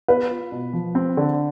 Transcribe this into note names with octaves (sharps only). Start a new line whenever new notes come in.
B3 B4
F4
B2
F3
C4
D3